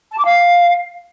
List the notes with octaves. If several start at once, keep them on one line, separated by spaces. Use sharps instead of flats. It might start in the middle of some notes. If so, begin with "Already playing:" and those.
A5
D6
F5